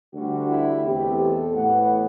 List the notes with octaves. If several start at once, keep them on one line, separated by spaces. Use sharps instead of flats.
D2 D3 G3 F#4
E4
E2 B2 A3 C4 G4
A4
A2 E3 B3 F#5